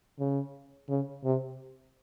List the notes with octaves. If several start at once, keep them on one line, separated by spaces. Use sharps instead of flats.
C#3
C#3
C3